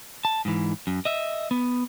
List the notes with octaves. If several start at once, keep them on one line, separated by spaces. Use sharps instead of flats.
A5
G#2 E3
F#2
D#5 E5
B3